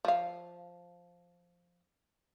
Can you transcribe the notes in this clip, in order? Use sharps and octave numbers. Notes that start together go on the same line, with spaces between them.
F3 F5